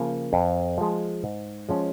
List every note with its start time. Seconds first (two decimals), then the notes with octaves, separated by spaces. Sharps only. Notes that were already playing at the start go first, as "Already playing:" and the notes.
Already playing: C#3 F3 A#3
0.33 F2
0.78 F3 G#3
1.24 G#2
1.69 F3 G#3 C#4